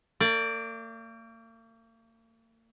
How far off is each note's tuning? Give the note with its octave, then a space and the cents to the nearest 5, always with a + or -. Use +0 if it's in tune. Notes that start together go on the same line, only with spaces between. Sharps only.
A#3 -45 D5 +0